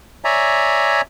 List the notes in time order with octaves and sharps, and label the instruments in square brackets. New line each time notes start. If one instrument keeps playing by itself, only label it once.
[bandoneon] C#5 D5 E5 G#5 A#5